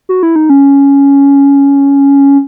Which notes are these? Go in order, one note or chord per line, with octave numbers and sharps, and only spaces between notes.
F#4
E4
D#4
C#4